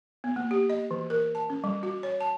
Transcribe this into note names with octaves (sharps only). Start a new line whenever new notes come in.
B3
A#3
G4
D#5
E3
A#4
A5
C#4
G3
F#4
C#5
A5